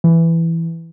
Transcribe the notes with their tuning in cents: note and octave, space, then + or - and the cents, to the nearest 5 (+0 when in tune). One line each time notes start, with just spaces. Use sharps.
E3 +5